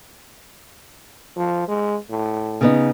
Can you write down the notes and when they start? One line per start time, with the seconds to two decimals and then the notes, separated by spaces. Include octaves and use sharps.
1.37 F3
1.68 G#3
2.10 A2
2.61 C#3 B3 D#4